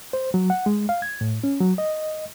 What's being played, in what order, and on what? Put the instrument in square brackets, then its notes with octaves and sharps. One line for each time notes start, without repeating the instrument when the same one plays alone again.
[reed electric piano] C5
F#3
F#5
G#3
F5
G#6
A2
C#4
F#3
D#5